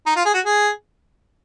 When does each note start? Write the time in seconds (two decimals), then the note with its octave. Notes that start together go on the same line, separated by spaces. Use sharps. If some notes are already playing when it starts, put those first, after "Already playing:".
0.06 D#4
0.16 F4
0.25 G#4
0.34 F#4
0.45 G#4